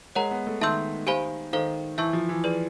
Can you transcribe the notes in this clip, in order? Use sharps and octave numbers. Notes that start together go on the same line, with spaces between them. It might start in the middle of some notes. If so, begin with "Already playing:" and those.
G#3 A#4 C#5 F#5 A#5
B3
A3
D#3 E5 A5 C6 E6 G6
G4 C5 F5 G#5 B5
D#3 A4 C5 F5
E3 E5 A5 C#6 E6 G6
F3
E3
G#4 B4 D5